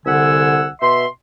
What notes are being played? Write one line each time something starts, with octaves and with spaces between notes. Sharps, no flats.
C2 D3 F#5 G#5 E6
B2 E5 C6